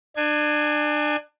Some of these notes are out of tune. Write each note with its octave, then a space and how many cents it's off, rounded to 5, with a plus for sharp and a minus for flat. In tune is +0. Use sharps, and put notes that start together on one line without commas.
D4 +30 G#5 +0